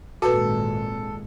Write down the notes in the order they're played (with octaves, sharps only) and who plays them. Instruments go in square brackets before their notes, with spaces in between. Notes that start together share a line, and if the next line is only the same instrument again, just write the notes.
[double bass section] G#1 A#2 G#3 [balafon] F#4 B4 [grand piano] A4